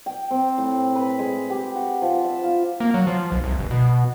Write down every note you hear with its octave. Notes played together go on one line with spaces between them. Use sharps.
G5
C4
A2
B4
G#3
G4
F#4
F3
E5
F4
A#3
F#3
F3
B1
C2
G1
B2